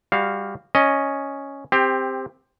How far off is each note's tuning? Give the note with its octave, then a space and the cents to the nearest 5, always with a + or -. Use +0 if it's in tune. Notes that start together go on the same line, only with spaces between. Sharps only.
G3 +20 F#4 +0 F5 +0
C#4 +0 D#5 +0
C4 +0 G4 +20